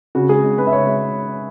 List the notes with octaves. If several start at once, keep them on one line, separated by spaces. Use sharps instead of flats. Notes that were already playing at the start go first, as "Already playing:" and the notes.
C#3 F#4
G#3 G#4
G#3
G#3 B4
E5
C#3 C#5
G#3